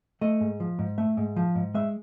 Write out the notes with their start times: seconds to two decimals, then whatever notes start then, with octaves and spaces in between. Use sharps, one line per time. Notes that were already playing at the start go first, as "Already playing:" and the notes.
0.21 A3 D#5
0.41 G#2
0.60 F3
0.79 G#2
0.98 A3 E5
1.17 G#2
1.36 F3
1.55 G#2
1.74 G#3 E5